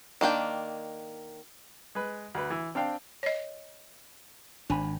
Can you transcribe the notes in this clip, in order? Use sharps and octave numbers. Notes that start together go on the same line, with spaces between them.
D#3 A#3 D4 G5
G#3 B4
D2 B4
E3
C4 D4 F5 G5
C#5 D#5
G#1 D4 G#5 B5